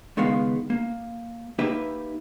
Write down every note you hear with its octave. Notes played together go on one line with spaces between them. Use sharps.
C#2 D#3 G#3 B3 F5
A#3
A#3 D#4 G4 B4 E5